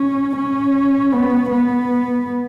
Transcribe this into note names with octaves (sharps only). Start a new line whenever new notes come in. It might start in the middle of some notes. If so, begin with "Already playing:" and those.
Already playing: C#4
C#4
B3
B3